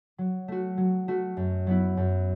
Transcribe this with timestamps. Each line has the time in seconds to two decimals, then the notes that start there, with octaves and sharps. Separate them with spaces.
0.18 F#3
0.48 A3 F#4
0.77 F#3
1.08 A3 F#4
1.37 F#2
1.67 F#3 B3 E4
1.97 F#2